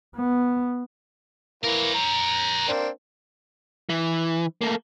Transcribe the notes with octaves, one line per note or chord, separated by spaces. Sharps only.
B3
E3 A#3 A#4 C#5
A#5
A#3 C4 D4
E3
A3 A#3